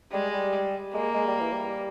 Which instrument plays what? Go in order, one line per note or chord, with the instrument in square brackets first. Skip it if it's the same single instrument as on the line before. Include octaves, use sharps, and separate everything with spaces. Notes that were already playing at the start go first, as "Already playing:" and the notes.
[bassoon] G3 [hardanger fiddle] G#3
[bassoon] G3
[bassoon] G#3 [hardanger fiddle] A#3
[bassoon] G#3
G3
E3
G3